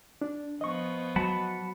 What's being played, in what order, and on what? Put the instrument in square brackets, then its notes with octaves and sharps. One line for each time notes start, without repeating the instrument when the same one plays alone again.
[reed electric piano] D4
[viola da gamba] F3 B3 [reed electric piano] D#5 C#6
[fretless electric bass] F#3 [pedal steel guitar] F#5 A5 B5